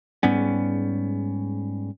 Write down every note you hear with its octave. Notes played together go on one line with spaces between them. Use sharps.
G#2 G3 B3 C#4